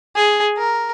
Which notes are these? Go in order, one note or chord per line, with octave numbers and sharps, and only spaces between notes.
G#4
A#4